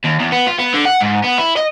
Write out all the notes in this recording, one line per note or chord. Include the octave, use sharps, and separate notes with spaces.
D#2
E2
B3
F4
B3
D3
F#5
G#2
B3
E4
D#5